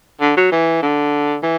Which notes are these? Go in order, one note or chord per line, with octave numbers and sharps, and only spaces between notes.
D3
F#3
E3
D3
E3